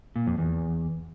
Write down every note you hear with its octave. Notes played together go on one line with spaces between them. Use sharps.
A#2
F2
E2